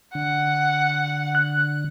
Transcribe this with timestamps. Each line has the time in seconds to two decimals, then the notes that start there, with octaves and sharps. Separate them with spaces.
0.15 D3 F#5
1.35 F#6